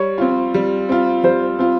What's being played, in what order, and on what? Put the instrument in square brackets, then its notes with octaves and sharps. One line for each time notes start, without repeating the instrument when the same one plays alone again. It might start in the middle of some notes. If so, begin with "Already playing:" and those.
Already playing: [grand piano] G3 [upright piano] C#5
[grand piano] C4 F4
G3
C4 F4
[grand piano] G3 [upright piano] C5
[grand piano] C4 F4